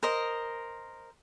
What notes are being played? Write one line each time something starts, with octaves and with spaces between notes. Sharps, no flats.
A#4 C5 D#5